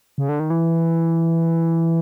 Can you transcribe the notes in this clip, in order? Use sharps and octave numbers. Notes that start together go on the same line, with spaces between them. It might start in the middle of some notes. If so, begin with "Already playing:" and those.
C#3
D3
D#3
E3